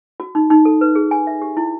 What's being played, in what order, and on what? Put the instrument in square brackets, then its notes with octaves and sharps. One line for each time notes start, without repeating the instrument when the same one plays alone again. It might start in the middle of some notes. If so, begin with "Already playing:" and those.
[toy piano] F#4
D#4
D#4
A4
B4
G#4
G#5
E5
G4
E4